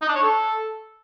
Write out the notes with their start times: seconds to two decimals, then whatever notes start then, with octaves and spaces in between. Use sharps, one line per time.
0.02 D#4
0.09 D4
0.15 C#5
0.22 A4